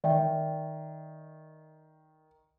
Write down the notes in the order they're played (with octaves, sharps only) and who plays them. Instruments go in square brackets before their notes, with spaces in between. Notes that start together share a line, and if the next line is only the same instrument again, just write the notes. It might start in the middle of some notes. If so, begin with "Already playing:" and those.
[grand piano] D#3 [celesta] D5 E5 G5